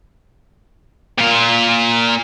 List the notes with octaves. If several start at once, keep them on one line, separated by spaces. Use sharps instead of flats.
A#2 F4